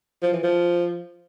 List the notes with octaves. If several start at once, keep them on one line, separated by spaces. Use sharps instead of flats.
F3
E3
F3